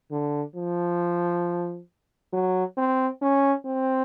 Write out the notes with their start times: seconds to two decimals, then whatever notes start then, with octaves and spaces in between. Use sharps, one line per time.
0.11 D3
0.56 F3
2.33 F#3
2.77 C4
3.22 C#4
3.66 C4